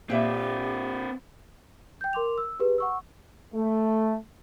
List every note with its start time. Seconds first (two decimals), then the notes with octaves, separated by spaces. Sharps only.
0.10 A#2 C4 G4 B4 E5
2.01 G5 G6
2.13 A#4 C6 D6 F7
2.38 E6
2.60 G4 G#4 B4
2.78 F#5 C#6 E6
3.54 A3